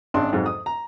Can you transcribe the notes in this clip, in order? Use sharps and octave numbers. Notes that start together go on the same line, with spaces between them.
G#1 C#4 D4 C6
F2 G#2 F#3
D#6
A#5